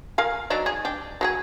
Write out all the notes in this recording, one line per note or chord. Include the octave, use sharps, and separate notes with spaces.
A#4 F5 G#5
F#3 D4 D#4
G#4
D4 G4
F#3 G4 G#4